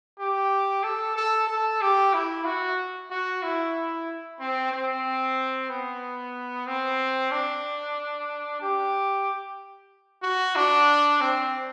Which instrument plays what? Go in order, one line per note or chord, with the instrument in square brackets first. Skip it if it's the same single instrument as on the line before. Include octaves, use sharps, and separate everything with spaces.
[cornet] G4
A4
A4
A4
G4
E4
F#4
F#4
E4
C4
C4
B3
C4
D4
G4
F#4
D4
C4